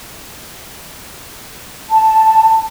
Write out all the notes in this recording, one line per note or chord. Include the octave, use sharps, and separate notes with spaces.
A5